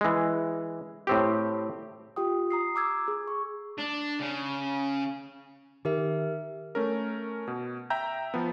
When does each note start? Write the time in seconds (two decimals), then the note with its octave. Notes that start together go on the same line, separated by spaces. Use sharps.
0.01 E3 G#3
1.07 A2 C4 G4
2.16 F4 G4 G5 D#6
2.51 A#5 D#6 C7
2.75 A#5 D6 E6 G#6
3.08 G#4
3.28 C#6
3.78 D4
4.19 C#3
5.85 D#3 G4 A#4 E5
6.75 A3 C#4 A#4
7.48 B2
7.90 E5 G5 A#5 G6
8.34 F3 B3